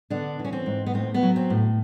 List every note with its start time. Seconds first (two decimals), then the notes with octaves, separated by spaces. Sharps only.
0.10 D3 B3 D4
0.39 E3
0.45 C#4
0.53 C4
0.66 G#2
0.86 B3
0.94 A2 C4
1.14 B3
1.23 F#3
1.36 C4
1.50 A2